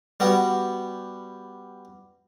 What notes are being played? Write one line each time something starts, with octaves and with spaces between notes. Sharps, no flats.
G3 B3 F#4